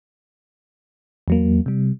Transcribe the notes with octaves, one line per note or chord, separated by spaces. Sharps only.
E2 F#3 A#3
C3 G3